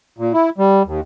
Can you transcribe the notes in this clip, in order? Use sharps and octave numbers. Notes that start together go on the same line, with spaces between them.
A#2
E4
G3
D#2